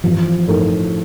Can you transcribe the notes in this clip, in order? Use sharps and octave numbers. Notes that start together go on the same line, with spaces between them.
A1 F3
A2 A3 D#4 A#4